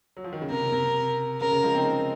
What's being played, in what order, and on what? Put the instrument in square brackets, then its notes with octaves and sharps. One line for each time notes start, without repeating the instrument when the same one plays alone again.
[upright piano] F#3
F3
D#3
C#3
[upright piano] C3 [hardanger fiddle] A#4
[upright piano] C3
[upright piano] C#3 [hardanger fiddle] A#4
[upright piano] C#3
F3 G#3
C4 D#4